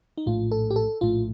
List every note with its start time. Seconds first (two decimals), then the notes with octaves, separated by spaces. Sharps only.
0.18 D#4
0.26 A#1 A2 A3 F4
0.51 A4
0.71 G4
0.76 A4
1.01 A#1 A2 A3 F4